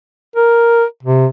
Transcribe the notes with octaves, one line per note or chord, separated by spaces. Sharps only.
A#4
C3